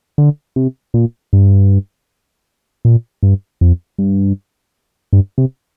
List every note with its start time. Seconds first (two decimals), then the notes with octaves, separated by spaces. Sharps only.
0.18 D3
0.56 C3
0.94 A#2
1.33 G2
2.85 A#2
3.23 G2
3.61 F2
3.98 G2
5.13 G2
5.38 C3